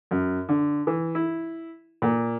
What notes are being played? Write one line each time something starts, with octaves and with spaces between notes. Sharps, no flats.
F#2
D3
E3
E4
A#2